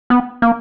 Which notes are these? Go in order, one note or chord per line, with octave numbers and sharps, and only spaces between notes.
B3
A#3